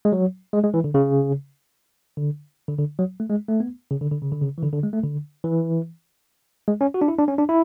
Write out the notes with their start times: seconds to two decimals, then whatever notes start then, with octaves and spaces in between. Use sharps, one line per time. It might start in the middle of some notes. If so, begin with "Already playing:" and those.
0.05 G#3
0.12 F#3
0.53 G#3
0.64 G#3
0.74 E3
0.84 D3
0.94 C#3
2.17 D3
2.68 D3
2.79 D3
2.99 F#3
3.20 A3
3.30 G#3
3.49 A3
3.60 B3
3.91 C#3
4.01 D3
4.12 D3
4.22 C#3
4.32 D3
4.41 C#3
4.58 E3
4.63 D3
4.73 D3
4.83 G#3
4.93 A3
5.04 D3
5.44 E3
6.68 G#3
6.81 C#4
6.94 F#4
7.01 D4
7.08 E4
7.18 D4
7.28 C#4
7.38 D4
7.49 E4